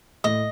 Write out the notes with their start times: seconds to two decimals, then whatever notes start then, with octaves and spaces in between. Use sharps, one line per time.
0.24 A2 D#5